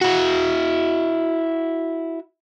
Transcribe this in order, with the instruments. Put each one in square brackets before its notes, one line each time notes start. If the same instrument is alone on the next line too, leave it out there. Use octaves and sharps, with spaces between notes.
[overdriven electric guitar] E4 F#4